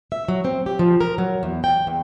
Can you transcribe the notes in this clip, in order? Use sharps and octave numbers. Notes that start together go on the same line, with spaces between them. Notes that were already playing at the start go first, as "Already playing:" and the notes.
E5
F#3
C4
G4
F3
A#4
F#3
E2
G5
E2